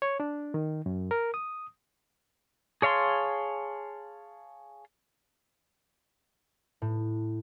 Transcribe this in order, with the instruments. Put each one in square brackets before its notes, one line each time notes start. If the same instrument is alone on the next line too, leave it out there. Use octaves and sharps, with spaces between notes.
[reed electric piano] C#5
D4
D#3
F#2
A#4
D#6
[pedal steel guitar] G#4 C#5 F5 A5 C6
[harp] A2